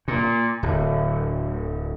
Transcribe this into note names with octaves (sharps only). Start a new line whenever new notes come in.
A#2
D1